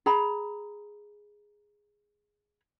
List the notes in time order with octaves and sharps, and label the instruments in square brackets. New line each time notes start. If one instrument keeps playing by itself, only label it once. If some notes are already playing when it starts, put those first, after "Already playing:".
[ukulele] G#4 A#5 B5